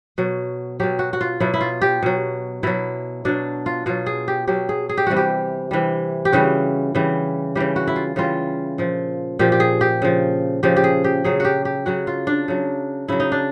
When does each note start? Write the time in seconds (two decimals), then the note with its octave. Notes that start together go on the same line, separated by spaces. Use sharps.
0.18 B2 F#3
0.80 B2 F#3 G4
0.99 F#4
1.13 F#4
1.21 F4
1.40 B2 F#3 E4
1.54 E4
1.61 F4
1.82 G4
2.02 B2 F#3
2.63 B2 F#3 E4
3.25 B2 F#3 D4
3.66 F4
3.86 B2 F#3 F4
4.06 G#4
4.28 G4
4.47 B2 F#3 G4
4.69 G#4
4.89 G#4
4.97 G4
5.07 C3 E3 G3 F#4
5.17 G4
5.71 C3 E3 G3
6.25 G4
6.32 C#3 E3 G3 F#4
6.95 C#3 E3 G3
7.55 C#3 E3 G3 G4
7.76 F#4
7.87 E4
7.96 F4
8.16 C#3 E3 G3 F4
8.78 A#2 F3
9.39 A#2 F3 G4
9.52 G4
9.60 G#4
9.81 G4
10.02 C#3 F3
10.63 C#3 F3 G4
10.76 G4
10.84 G#4
11.04 G4
11.24 C#3 F#3 G#4
11.40 F#4 G4
11.65 G4
11.86 C#3 F#3 F#4
12.07 F4
12.27 D4
12.48 C#3 F#3
13.08 C#3 F#3 E4
13.20 D#4
13.32 D4